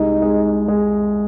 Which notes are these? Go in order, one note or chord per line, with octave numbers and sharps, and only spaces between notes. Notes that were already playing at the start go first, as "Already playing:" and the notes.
Already playing: C2 G#3 D#4
G#3
G#3